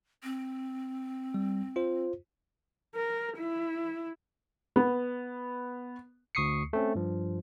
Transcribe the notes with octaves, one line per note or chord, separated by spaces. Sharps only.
C4
G3
F4 C5
A#4
E4
B3
D2 C#6 D#6 C7 C#7
A3 C4 C#4
G2 F3